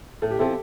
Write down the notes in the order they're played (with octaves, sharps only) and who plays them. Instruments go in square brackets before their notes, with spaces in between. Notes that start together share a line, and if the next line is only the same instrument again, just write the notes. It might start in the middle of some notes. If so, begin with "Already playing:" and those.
[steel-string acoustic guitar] A2 [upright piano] A4
[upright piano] G4
[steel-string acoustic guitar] F3 C4 E4 [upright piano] A4